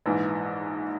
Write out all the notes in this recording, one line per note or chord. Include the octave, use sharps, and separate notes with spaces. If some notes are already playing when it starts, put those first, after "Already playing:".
A#1 G#2 E3